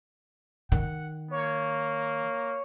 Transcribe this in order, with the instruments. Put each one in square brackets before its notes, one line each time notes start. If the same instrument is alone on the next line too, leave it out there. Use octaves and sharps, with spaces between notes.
[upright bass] D#3 [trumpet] F#5
[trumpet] A#3 [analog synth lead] C#5